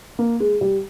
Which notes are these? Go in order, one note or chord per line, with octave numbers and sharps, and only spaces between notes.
A#3
G#3
G3